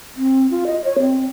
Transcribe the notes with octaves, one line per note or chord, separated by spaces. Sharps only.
C4
F4
D#5
C#5
C4